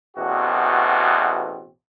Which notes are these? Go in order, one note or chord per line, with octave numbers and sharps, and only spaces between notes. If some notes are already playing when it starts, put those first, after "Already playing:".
A1 E2 B2 C4 F#4 G4